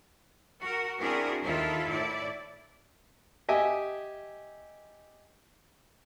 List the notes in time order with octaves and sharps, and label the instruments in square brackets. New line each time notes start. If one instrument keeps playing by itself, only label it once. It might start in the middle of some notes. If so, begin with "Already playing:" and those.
[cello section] F#4 A#4
C4 D4 E4 F#4 G#4 A#4
D#2 D#3 E4 F4 A4 E5
A2 E4 D5
[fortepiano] G4 D#5 E5 G5 G#5